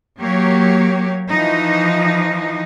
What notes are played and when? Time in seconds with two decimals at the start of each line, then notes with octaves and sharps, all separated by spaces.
0.20 F#3 A#3 G4 C#5
1.30 E3 F3 D#4